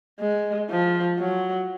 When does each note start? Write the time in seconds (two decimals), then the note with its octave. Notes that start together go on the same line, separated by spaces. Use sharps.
0.20 G#3
0.70 F3
1.19 F#3